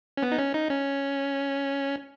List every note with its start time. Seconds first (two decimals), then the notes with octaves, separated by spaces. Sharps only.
0.17 C#4
0.23 B3
0.32 D#4
0.39 C#4
0.54 D#4
0.70 C#4